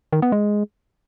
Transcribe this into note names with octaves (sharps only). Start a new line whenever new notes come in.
D#3
B3
G#3